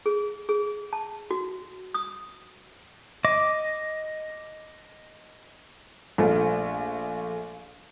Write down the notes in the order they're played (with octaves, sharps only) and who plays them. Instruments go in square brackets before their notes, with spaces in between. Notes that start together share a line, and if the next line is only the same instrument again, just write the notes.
[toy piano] G#4
G#4
A5
F#4
D#6
[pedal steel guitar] D#5 D6
[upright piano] A#1 A3 F4